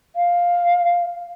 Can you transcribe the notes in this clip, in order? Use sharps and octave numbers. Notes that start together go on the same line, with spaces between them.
F5